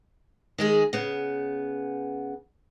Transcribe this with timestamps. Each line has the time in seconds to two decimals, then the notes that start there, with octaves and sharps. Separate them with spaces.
0.58 D#3 G#3 G#4
0.93 C#3 B3